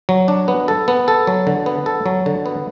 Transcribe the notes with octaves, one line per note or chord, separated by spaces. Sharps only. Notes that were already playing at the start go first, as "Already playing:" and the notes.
F#3
D4
B3
A4
B3
A4
F#3
D3
B3
A4
F#3
D3
B3